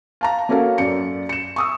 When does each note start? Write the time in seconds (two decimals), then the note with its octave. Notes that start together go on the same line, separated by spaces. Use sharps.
0.21 F5 A5 A#5
0.49 A#3 C#4 F#4 A4 A#4 F5
0.78 F#2 D5 C#7
1.29 C#7 E7
1.56 C#6 D#6 E6